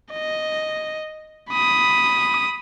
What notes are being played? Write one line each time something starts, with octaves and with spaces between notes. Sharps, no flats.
D#5
B5 D#6